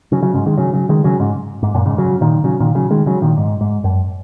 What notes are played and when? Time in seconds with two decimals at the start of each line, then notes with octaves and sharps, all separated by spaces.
0.12 C#3 F#3
0.23 C#3 F#3
0.34 G#2 C#3
0.46 D#3 G#3
0.58 C#3 F#3
0.73 C#3 F#3
0.89 D#3 G#3
1.04 C#3 F#3
1.20 G#2 C#3
1.63 G#2
1.74 F#2 A#2
1.86 G#2 C#3
1.98 C#3 F#3
2.21 A#2 D#3
2.44 C#3 F#3
2.60 A#2 D#3
2.75 C#3 F#3
2.91 D#3 G#3
3.06 C#3 F#3
3.22 A#2 D#3
3.38 G#2
3.61 G#2
3.84 F#2